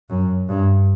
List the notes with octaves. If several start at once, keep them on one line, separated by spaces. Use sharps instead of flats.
F#2
G2